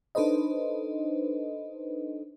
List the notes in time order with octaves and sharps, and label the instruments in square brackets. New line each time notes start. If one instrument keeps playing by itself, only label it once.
[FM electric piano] D4 D#4 A4 B4 C5 D#5